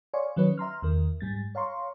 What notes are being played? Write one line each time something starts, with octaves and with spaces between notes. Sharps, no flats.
C#5 D5 F5 G#5 C6 C#6
D#3 F#3 C#4 B4 C#5
E5 A#5 C6 F6
E2 D#3 A#4
G#2 G3 A6
C#5 F5 A#5 C6 C#6